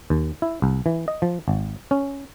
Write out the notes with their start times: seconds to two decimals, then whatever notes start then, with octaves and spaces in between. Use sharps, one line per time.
0.10 D#2
0.42 E4
0.62 C2
0.86 E3
1.08 D#5
1.22 F3
1.48 G#1
1.91 C#4